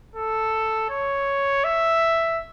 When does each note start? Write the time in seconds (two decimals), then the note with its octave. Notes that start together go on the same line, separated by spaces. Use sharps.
0.16 A4
0.90 C#5
1.64 E5